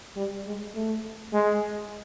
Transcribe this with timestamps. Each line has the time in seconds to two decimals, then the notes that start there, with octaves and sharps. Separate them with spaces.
0.17 G3
0.47 G#3
0.75 A3
1.33 G#3